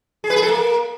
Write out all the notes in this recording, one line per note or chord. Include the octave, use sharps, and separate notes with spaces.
G#4
B4
G#4
A4
A#3